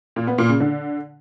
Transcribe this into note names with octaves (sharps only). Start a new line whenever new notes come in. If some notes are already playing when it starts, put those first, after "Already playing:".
A#2
B3
A#2
C#3
D3